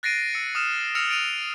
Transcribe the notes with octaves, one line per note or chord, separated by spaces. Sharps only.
F#6 A6 A#6 C7 D7 D#7
E6 C#7
D#6 F6 E7
E6 F6 A6 A#6 C#7 F7
A6 D7 D#7 F7